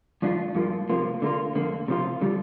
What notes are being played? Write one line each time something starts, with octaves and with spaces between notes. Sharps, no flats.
G2 F3 D4 F4
G2 F3 A#3 F4
C3 F3 A#3 F4
D3 A#3 F4
F2 D3 A#3
C3 F3 D4 F4
D3 G3 F4